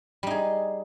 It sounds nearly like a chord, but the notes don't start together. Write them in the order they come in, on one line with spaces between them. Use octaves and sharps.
G3 D#4 G#4